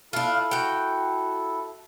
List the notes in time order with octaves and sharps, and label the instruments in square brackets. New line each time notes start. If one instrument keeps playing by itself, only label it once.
[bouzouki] D4 F4 [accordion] E4 A4
[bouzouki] F#4 G5